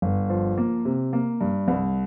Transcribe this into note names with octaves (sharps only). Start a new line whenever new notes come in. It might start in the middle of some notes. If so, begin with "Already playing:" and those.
G1
F3
A#3
C3
A#3
G2
C2